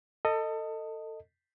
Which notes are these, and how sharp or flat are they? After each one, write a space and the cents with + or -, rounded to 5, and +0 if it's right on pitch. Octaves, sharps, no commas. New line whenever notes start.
A4 +25 D#5 +0